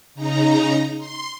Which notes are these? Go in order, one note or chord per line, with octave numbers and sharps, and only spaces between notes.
C#3 D#4 A#5
C6